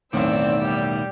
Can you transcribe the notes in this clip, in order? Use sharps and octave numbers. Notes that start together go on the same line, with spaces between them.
B1 E2 A2 D#3 C4 D5 E6
G3